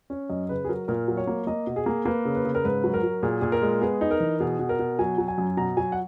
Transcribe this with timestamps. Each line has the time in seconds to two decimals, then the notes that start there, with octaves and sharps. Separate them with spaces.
0.10 C#4
0.29 F#2 D#5
0.49 C#3 B4
0.65 G#4
0.69 F#3 A#4
0.88 A#2 A#4
1.08 F#3
1.17 C#5
1.27 A#3
1.47 A#3 D#5
1.67 B2
1.76 G#4
1.86 A#3
2.05 A#3 B4
2.25 C#3
2.35 B4
2.45 C#3
2.55 A#4
2.64 G#2 B4
2.84 F#3
2.94 A#4
3.03 F#3
3.23 A#2 G#4
3.41 A#2 G#4
3.52 A#4
3.62 G#3
3.81 B3 G#4
4.01 D#4
4.11 A#4
4.20 E3
4.40 B2 G#4
4.59 B2
4.69 A#4
4.79 B2
4.99 F#3 G#5
5.18 F#3
5.28 G#5
5.38 F#2
5.57 B2 A#5
5.77 F#3 G#5
5.92 F#5